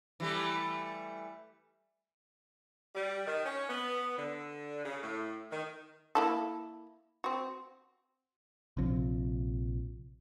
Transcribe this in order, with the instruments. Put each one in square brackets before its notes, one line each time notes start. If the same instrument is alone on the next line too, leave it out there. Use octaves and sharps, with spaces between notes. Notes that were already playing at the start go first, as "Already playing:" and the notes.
[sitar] E3 G3 A3
[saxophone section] G3
D#3
C#4
B3
D3
C#3
A2
D#3
[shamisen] A#3 E4 A4
C4 F#4
[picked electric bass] A#1 C3 F3